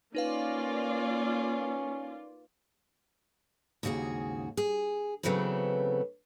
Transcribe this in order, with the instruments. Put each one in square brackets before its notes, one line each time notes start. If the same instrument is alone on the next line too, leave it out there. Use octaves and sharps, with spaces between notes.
[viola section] A#3 F4 D5 [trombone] C#4 [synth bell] D#4 B4 F5
[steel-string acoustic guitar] D#2 G#2 C#3 F#4 G#4
G#4
C#3 E3 F#3 A3 B3 C4